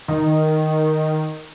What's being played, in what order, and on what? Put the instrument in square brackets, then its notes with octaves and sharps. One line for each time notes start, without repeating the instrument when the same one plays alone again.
[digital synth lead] D#3